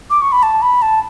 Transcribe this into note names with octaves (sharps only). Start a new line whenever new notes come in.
D6
C#6
B5
A5
B5
A5